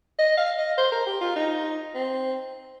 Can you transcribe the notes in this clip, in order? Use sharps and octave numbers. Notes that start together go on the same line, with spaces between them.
D#5
F5
D#5
C5
A#4
G4
F4
D#4
C4